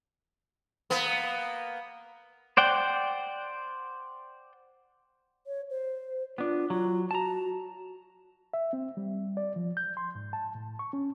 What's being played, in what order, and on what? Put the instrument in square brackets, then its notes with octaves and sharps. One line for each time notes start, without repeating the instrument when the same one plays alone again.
[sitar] A#3 B3
[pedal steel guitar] C5 D5 F#5 G5
[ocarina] C#5
C5
[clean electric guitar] B3 D4 [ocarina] F4
[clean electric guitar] F#3 [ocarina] F4
[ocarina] F#4 [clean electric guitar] A5 A#5
[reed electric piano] E5
C4
G3
D5
F3
G6
C6
G#2
A5
A2
C#6
C#4